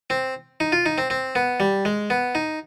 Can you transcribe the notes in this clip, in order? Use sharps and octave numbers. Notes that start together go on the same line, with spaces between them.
C4
D#4
F4
D#4
C4
C4
B3
G3
G#3
B3
D#4